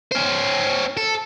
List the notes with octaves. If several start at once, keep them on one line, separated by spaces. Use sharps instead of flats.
C#4 C5
A4